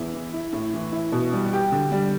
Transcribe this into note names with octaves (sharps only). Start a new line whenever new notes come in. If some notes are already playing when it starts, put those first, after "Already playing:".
Already playing: E2 E4
E3
E4
A2
E3
E4
B2
G3
G4
D3
G3